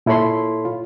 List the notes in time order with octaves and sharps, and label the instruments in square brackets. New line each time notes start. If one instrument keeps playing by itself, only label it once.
[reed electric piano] A#2 E4 A4 C#5 B5 C6
F4